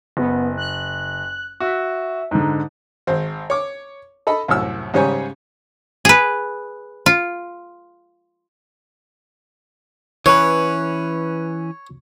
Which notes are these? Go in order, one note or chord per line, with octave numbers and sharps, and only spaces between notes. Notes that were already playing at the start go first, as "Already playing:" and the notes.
F#1 B3
F#6
F#4 E5
G#2 D3 D#4
G#1 C5
C#5 D6
A4 D#5 B5
C2 F#2 A2 E6
G#2 C#3 G3 C5 C#5 G#5
G#4 B4
F4
E3 C#4 B4 C#5